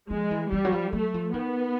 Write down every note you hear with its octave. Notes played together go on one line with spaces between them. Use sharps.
F3 G#3
E3
E3 G3
F#3
F3
F#3 A3
F3
D#3 B3